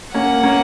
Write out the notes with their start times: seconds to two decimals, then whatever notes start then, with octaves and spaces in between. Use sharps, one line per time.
0.14 A#3 C#4 F#5
0.43 A#3 C#4